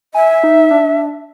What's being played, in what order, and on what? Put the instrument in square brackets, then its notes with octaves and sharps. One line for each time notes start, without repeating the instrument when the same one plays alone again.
[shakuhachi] E5 [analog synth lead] G#5
[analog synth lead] D#4
D4